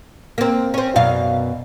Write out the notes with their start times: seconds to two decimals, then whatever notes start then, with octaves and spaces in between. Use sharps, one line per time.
0.38 A#3 C4
0.74 C4 C#4
0.96 F#2 B2 F5